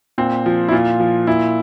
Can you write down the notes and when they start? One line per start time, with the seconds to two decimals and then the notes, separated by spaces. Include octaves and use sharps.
0.18 A#2 C4
0.46 F3
0.68 E4
0.72 A#2 F4
1.00 F3
1.27 A#2 E4